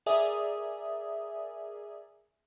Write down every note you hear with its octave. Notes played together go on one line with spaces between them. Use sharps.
G#4 A#4 D5 E5 G#5 D#6